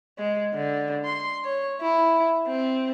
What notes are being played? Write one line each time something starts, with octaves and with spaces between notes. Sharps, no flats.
G#3
D3
C6
C#5
E4
C4